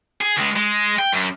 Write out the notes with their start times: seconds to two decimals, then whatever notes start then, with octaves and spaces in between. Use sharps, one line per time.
0.21 G#4
0.37 C#2 G#3
0.56 G#3
0.99 G5
1.12 F#2